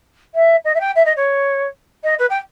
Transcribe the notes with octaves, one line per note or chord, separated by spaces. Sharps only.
E5
D#5
E5
G5
E5
D#5
C#5
D#5
B4
G5